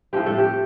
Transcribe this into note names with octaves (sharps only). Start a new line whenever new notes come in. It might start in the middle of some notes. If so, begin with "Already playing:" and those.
A2 F3 A3 C4 G4
A3 A4
G4